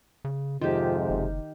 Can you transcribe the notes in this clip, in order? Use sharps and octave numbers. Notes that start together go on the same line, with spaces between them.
C#3
F2 G#2 C3 D#3 F4 G4
F#1